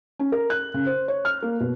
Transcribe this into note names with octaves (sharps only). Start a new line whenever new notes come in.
C#4
A#4
F#6
C#3
C5
C#5
F6
A#3
B2